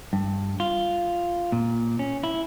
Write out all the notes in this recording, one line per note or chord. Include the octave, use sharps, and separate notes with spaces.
G2
F4
A#2
C#4
E4